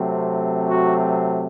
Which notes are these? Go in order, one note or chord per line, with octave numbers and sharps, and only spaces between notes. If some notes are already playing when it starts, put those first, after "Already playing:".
Already playing: C3 F#3 A3 C4
F#4